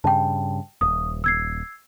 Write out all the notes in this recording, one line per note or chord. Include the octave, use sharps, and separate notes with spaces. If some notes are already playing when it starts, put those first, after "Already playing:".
G2 C#3 G5 A5
D#1 D#6
E6 G#6 C7